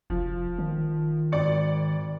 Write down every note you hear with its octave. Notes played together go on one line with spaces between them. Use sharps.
F1 F3
D#3
G#1 D5 C#7